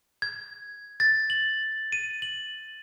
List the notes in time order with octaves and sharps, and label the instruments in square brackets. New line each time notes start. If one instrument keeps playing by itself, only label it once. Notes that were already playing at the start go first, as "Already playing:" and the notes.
[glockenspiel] G#6
A6
F#7
D#7
F#7